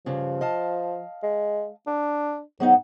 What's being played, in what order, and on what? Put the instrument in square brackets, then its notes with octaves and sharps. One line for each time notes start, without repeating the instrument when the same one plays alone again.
[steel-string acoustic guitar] G2 C#3 [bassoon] F3
[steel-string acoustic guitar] D#5 F5 A5
[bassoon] G#3
D4
[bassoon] G#2 [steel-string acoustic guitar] F#3 B3 D#4